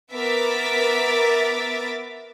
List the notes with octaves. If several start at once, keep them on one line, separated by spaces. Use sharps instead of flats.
B3 A#4 E5 D6 A6 B6